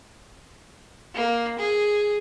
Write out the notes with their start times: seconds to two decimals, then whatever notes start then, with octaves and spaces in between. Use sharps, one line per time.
1.14 A#3
1.59 G#4